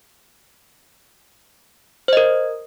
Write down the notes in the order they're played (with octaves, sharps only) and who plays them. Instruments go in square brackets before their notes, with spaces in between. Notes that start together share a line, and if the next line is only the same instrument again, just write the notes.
[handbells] C5
D#5
A#4